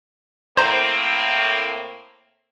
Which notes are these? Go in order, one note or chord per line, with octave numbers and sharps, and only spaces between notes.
A2 A#3 C4 C5 A#5